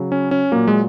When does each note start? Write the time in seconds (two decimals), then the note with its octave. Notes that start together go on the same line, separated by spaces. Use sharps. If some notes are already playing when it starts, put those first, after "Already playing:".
Already playing: C#3 F#3
0.12 C#4
0.31 C#4
0.52 A#2 F#3 A#3
0.67 G#3